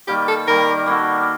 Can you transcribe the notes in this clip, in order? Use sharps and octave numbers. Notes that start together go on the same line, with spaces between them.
D#3 G3 A#3 G4
A4
D#3 G3 A#3 A#4
G3 A#3 F#4 A4